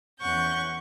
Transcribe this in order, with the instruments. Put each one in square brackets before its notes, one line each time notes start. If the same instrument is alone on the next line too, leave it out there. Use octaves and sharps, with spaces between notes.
[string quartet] E2 C#4 F#5 C#6 G6